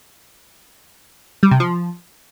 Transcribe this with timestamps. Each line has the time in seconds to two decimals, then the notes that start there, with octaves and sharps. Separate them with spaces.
1.43 G3
1.51 C3
1.60 F3